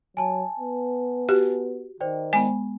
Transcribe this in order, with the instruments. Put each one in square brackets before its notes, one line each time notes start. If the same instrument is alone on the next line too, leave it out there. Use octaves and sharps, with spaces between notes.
[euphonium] F#3 [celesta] G#5 A5
[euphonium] B3
[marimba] F#4 [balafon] G4
[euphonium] D#3 [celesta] C5 D5 G5
[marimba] G#3 B3 [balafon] G#5